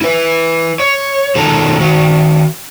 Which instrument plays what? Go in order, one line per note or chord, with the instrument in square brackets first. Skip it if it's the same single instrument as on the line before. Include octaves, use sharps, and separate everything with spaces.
[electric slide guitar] E4 B4
C#5
B2 D#3 F4 A4 A#5
D#3 F#4